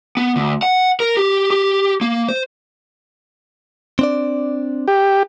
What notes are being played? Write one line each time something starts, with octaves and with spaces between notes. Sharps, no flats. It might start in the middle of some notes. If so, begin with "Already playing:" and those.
B3
D2
F#5
A#4
G4
G4
A#3
C5
C4 D4 D5
G4